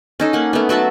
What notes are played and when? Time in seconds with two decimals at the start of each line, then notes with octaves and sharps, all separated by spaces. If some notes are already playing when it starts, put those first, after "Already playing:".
0.20 C#4 D#4 A4
0.33 A#3 F#5
0.53 A3 B3
0.69 F#3 F#4 E5 A5